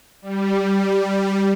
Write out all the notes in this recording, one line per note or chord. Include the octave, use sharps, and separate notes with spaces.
G3